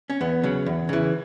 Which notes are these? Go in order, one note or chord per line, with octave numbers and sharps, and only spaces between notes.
C#4
E2 B3
C#3 F#3
E2
C#3 E3